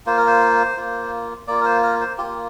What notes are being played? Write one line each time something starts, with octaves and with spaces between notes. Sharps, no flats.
A#3 F4 C5
A#4
C5
A#3 F4
A#3 F4 D5
A#4
C5
A#4
C5
A#3 F4 G4